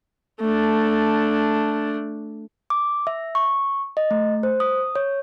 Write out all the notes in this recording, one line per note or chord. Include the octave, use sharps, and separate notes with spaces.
A3 D4
D6
E5
C#6
D#5
A3
C5
D#6
C#5